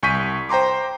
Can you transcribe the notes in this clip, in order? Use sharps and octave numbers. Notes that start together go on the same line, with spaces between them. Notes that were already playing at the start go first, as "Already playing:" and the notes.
C2 G#5 C#6 G6 B6 D#7
C5 G5 A#5 C6 D6